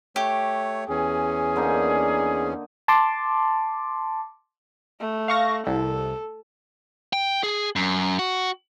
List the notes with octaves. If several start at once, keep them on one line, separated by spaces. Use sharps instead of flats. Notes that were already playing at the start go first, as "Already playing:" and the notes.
A3 G4 C#5
E2 C#4 G#4
D3 A#3 D#4
A5 C6 D6
A3
F5 C#6 A#6
C2 A4
G5
G#4
F#2
F#4